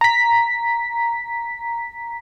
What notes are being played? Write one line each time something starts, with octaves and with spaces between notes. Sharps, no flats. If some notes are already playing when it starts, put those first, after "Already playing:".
A#5 B6